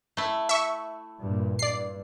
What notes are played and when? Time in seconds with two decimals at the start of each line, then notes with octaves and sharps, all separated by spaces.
0.17 A3 E4
0.49 E5 C#6
1.21 G2 A#2
1.59 G2 D5 C7